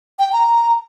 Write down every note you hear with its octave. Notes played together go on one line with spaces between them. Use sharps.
G5
A#5